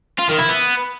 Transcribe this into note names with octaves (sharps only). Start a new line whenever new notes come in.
F4
D#3
E4
B3